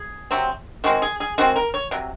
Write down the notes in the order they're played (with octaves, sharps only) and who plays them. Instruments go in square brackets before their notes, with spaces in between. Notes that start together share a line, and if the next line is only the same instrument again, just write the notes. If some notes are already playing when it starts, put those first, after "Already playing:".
Already playing: [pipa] G#4
C3 F#3 C4
D#3 G#3 C4 F#4
G#4
G#4
D#3 G#3 C4 F#4
A#4
C#5
C3 F#3